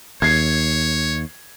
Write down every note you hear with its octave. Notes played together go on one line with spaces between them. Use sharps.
D#2 C#5 G#6 C7